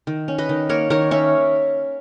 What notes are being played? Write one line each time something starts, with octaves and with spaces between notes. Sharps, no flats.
D#3
C#4
B4 D#5
D#3
A#3 A#4 C#5
D#3 A#4 C#5
C#4 C#5 E5